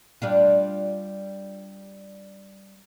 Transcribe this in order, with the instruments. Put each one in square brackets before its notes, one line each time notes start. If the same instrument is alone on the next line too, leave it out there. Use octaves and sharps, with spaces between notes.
[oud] G3 D4 F4